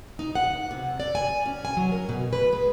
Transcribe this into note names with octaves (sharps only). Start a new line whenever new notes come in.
D#4
F#5
C3
D5
G#5
C#4
G#5
F#3
A#4
B2
B4
G#3